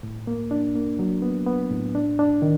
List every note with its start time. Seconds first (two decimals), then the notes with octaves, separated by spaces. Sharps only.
0.03 A2
0.27 A#3
0.51 D4
0.75 A#3
0.99 F#3
1.22 B3
1.47 B3
1.71 A2
1.95 D4
2.19 D4
2.42 D#3